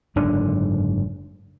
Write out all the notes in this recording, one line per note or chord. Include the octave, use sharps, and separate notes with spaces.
F#1 G#2 D3 D4